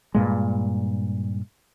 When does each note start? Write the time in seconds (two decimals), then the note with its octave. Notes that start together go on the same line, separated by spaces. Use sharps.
0.15 G2 A#2 G#3